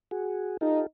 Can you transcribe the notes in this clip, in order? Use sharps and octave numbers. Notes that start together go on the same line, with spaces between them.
F#4 G#4
D#4 F4 G4 A4